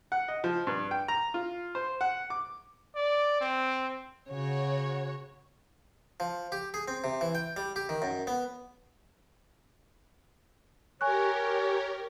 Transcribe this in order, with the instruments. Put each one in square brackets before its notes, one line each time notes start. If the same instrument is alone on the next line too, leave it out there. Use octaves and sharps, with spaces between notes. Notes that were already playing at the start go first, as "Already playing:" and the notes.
[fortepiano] F#5
D#5
F3
G2
G5
A#5
F4
C5
F#5
D6
[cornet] D5
C4
[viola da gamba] C#3 [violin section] F#4 C#5
[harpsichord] F3
G4
G#4
C4
C3
E3
G5
G3
G4
D#3
F#2
B3
[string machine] G4 A#4 [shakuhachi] C#5 [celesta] G#5 C#6 F#6